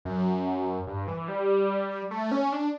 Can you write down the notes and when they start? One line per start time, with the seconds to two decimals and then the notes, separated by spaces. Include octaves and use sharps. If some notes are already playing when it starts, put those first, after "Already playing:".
0.05 F#2
0.87 G2
1.08 E3
1.28 G3
2.11 A3
2.31 C#4
2.52 D4